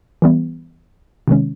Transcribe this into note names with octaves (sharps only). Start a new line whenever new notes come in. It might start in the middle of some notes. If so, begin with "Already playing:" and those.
E3 G3 B3
C3 D#3 G#3 C#4